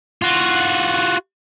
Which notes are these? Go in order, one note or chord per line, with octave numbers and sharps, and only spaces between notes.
F4 F#4